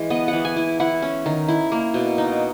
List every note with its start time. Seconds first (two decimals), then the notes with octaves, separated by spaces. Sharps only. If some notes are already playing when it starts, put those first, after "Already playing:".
Already playing: E3 G#3
0.10 B3 D#5
0.28 F#5
0.33 E3
0.45 G#5
0.57 E4
0.80 E4 F#5
1.02 C#4
1.26 D#3
1.48 E4
1.72 A#3
1.94 B2
2.18 D#4